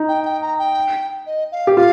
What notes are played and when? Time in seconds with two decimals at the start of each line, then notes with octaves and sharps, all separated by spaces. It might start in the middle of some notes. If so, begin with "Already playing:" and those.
Already playing: D#4
0.08 G5
0.25 G5
0.42 A#5
0.58 G5
1.26 D#5
1.52 F5
1.67 G4
1.77 F4 F5